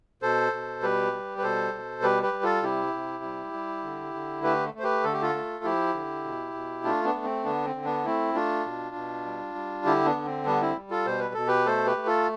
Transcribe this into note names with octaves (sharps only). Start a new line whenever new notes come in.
B2 A4 C5
B2
G3 G4 B4
G3
B4
B2 A4 C5
B2
G3 G4 B4
G4 B4
G3
F4 A4
C3 E4 G4
C3
G3
G3
D3
D3
A3 G4 B4
A3 C5
G4 B4
D3 A4
G4
F4 A4
A3
F3 E4 G4
D3
B2
B2
A3 D4 F4
B3 D4
A3
C4
D3 B3 D4
C4
D3
B3 D4
A3 C4 E4
A3 D4 F4
B2
B2
G3
G3
D3 E4 G4
B3 D4
D3
C4
G3 B3 D4
C4 E4
G3
F4 A4
B2 C5
B4
B2 A4
G4 B4
A3 A4 C5
G4 B4
A3
F4 A4